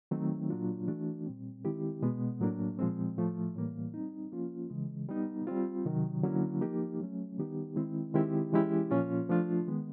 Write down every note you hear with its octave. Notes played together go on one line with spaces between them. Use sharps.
D#3 F#3 A3 C4 D#4
A#2 F#3 A#3 D4 F4
E3 A3 D4 F#4
A#2 G3 C4
D#3 G#3 C4 E4 G4
B2 G#3 B3
A2 F#3 A#3 D4
A#2 F3 G#3 C4
A2 F3 A3
A2 E3 G3 A#3
G3 C4 D#4
F3 A#3 C#4 F4
C#3 E3 G#3
G3 B3 D#4
G3 C4 F4
C3 D#3 F#3
D3 F#3 A#3 C#4 E4
F3 A#3 D#4 G4
F#3 A3 C#4
D#3 G3 B3 D#4 G4
D#3 G#3 C4 E4
D#3 G#3 C4 E4 G4
E3 G#3 C#4 E4 G4
A#2 F3 A#3 C#4 F4
F3 A3 D4 F4
D#3 G#3 B3